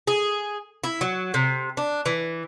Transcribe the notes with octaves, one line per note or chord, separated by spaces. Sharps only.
G#4
E4
F#3
C3
D4
E3